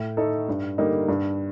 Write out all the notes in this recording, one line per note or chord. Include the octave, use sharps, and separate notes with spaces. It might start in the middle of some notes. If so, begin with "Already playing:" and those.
Already playing: A2
A3 D#4 A4
G2
D3 G3 A#3 D#4
G2